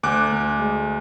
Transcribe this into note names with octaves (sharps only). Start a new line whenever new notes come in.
D2 D6 F#6
D2
G#3